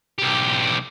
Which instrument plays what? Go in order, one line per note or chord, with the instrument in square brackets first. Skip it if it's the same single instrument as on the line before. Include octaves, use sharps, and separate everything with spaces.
[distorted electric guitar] B1 G4